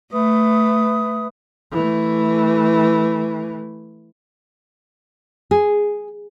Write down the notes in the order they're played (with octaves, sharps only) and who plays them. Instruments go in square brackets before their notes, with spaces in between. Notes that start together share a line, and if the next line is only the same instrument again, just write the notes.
[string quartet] A3 [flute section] B4 E5 D#6
[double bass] E3 A3
[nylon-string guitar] G#4